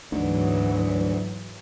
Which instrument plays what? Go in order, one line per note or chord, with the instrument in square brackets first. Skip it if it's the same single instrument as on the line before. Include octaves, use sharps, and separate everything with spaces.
[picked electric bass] D2 D3 [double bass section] G#2 E3 F#3 [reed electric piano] D#4